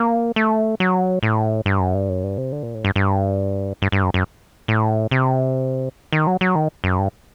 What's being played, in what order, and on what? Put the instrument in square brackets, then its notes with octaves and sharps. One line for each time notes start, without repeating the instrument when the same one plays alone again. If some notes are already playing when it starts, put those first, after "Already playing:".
Already playing: [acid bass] A#3
A3
F#3
A2
G2
F#2
G2
F#2
G2
C3
D3
A#2
A2
G2
G2
G2
G2
F#2
F#2
A2
C3
D#3
F#3
F#3
D#3
F#2
G2